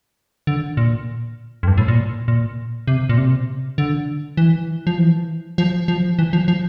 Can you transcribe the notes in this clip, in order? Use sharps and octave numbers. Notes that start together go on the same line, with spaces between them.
D3
A#2
F2
G2
A2
A#2
A#2
C3
A#2
C3
D3
E3
F3
E3
F3
F3
E3
F3
F3